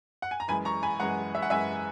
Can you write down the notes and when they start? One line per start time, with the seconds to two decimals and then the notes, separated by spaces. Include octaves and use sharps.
0.22 F#5
0.31 G#5
0.40 A#5
0.48 F#2 E3 G#3 G#5 B5
0.65 A#5 C#6
0.83 G#5 B5
1.00 F#2 E3 G#3 F#5 A#5
1.35 E5
1.42 F#5
1.50 F#2 E3 G#3 E5 G#5